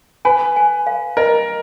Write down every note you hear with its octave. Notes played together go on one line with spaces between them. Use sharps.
B4 G#5
G#5
F5
A#4 D#5